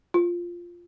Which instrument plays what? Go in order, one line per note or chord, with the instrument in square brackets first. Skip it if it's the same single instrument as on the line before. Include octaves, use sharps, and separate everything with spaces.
[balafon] F4